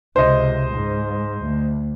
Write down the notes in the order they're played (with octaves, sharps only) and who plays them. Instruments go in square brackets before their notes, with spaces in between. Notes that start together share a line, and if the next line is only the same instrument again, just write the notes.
[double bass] C#2 C3 [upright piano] C5 D#5
[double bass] G#2
D2